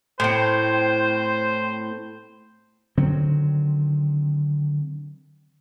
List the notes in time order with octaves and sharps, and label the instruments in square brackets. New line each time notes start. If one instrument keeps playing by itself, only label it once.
[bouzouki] A2 C4 [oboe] C5
[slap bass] D3 D#3 F#3 C4